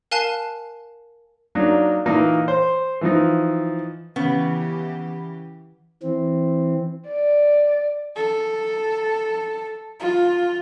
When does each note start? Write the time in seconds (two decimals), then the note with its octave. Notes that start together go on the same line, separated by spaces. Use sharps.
0.11 A#4 F5 G#5 A5 F#6 C7
1.55 F#3 A#3 D4 D#4
2.06 A#2 E3 A#3 D#4
2.48 C5
3.01 E3 F3 D#4
4.16 C#3 E3 B3 G4
6.03 E3 C4
7.09 D5
8.16 A4
10.00 F4